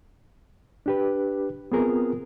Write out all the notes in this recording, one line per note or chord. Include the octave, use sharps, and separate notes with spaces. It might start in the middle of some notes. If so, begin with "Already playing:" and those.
D4 G4 B4
B3 C4 F4 G#4 A#4